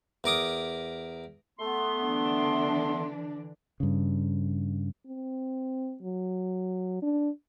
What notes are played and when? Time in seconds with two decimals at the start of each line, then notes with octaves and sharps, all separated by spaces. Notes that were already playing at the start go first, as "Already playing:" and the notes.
0.24 E2 A#4 D6 D#6
1.59 A3 B3 C6
2.00 D3 E3 D4
3.80 G2 C#3
5.07 C4
6.02 F#3
7.02 D4